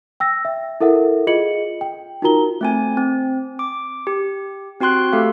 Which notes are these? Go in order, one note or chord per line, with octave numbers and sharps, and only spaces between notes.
G5 E6 A#6
E5
E4 A4 A#4 E5 F#5
F4 G#4 D#5 C#7 F#7
G5
D#4 F4 F#4 A#4 A#5 G7
A3 C4 G#5
C4
D6
G4
C4 F#4 G5 C6 F#6
A3 G4 A4 F5